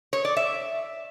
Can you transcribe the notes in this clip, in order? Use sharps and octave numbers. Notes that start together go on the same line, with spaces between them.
C#5
D5
E5